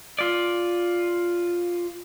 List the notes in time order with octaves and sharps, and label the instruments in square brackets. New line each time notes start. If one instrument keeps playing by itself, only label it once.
[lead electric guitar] F4 D5